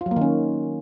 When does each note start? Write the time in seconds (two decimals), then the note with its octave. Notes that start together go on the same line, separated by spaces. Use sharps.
0.01 F4
0.06 F#3
0.11 A#3
0.16 D#3
0.21 C#4